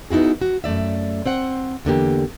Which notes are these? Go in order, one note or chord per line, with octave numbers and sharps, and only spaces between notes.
B3 D#4 E4 F#4 G#4
F#4
F#2 A3 D5 E5
C4 C5 F#5
E2 D3 A#3 G4